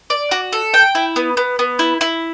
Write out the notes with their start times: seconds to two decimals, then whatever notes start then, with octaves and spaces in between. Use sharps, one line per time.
0.10 D5
0.31 F#4
0.52 A4
0.74 G5
0.95 E4
1.16 B3
1.37 B3
1.59 B3
1.79 E4
2.01 E4